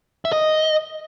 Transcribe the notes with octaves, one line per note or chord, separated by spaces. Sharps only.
E5
D#5